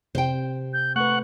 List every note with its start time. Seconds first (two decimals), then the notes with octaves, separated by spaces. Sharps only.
0.15 C3 C5 G5
0.73 G6
0.96 A3 B4 F#5 C#6